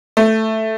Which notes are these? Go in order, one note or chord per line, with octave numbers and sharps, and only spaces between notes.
A3